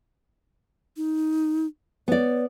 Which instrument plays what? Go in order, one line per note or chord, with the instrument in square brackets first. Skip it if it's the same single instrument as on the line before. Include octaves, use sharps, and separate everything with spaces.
[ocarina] D#4
[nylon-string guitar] B3 D5 [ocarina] C#5